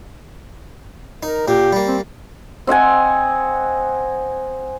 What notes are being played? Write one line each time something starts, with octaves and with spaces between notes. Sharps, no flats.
D#4 A#4
A#2 A#3 G4
G3 A#3
C4
C4 D#5 F#5 G#5